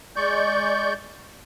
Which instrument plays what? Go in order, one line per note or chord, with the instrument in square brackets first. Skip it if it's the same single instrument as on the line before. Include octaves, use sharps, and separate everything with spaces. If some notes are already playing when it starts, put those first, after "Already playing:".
[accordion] G#3 D5 C#6 G6